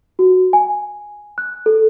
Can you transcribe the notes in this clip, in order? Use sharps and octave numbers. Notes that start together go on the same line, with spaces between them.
F#4
G#5
F#6
A4